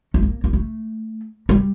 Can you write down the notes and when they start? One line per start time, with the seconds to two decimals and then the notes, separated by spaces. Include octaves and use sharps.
0.14 A3
0.23 A#3
0.44 A#3
0.53 A3
1.49 G3